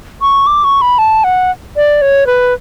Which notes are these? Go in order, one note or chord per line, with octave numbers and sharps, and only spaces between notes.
C#6
D6
C#6
B5
A5
F#5
D5
C#5
B4